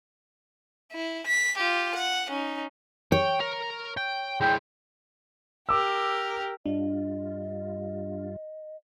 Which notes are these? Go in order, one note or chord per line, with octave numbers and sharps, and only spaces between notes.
E4
B6
F4 G4
F#5
C#4 D#4
C#5 G5
A#4
G5
G#3 E4 G5
G4 A#4 D6 E6
G2 G3 D4 F4 D#5